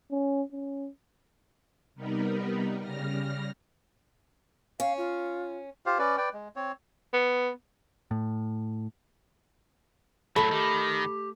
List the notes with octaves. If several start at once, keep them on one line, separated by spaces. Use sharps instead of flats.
C#4
C#4
C3 G3 B3 D#4 A#4 B4
C#3 G3 F6 A#6
C#4 F5
F4
F4 G4 C5 F5
C#4 B4 D5
B4 D5 G5
G#3
C4 C#5
B3
A2
A2 F#3 A3 E5 B5
D#3 G4